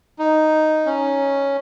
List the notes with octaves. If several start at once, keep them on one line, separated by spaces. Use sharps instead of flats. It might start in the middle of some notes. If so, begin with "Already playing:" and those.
D#4
C#4